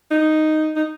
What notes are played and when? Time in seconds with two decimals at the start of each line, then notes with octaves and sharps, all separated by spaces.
0.11 D#4
0.76 D#4